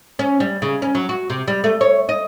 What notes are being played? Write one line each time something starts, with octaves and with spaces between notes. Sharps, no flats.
C#4
G3
C#3
C#4
F#3
F#4
C3
G3
A3
C#5
D#5